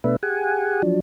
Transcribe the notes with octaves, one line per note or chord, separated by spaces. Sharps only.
B2 A3 B3 D4 B4 E5
G4 G#4 F#5 G#5
F3 F#3 D4